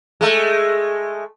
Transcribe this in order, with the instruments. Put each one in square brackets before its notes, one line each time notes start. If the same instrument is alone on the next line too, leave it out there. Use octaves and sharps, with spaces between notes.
[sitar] G#3 A3